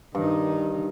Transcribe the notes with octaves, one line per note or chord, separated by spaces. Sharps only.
G2 D#3 D#4